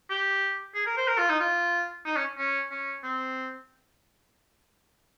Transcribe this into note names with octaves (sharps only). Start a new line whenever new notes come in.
G4
G#4
A#4
C5
A#4
F4
D#4
F4
D#4
C#4
C#4
C#4
C4